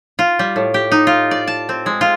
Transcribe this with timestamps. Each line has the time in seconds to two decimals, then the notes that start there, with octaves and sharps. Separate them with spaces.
0.19 F4
0.39 G3
0.56 A2
0.74 G4
0.92 D#4
1.07 F4
1.31 D5
1.48 A5
1.69 C4
1.86 G#3
2.01 F4